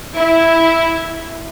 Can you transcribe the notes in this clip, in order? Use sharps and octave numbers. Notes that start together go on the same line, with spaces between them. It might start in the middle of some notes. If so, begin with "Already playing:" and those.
E4